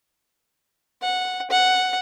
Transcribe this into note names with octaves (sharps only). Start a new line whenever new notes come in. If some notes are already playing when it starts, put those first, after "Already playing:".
F#5
F#5